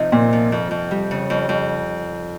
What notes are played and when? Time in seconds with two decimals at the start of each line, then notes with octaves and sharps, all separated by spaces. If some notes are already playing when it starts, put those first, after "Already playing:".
Already playing: C3 F3 D#4
0.12 A#2 C4
0.33 F3
0.52 F2
0.71 F2
0.91 G3
1.11 C#3
1.30 F2
1.49 F2